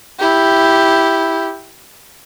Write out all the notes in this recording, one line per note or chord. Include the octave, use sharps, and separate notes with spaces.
E4 G4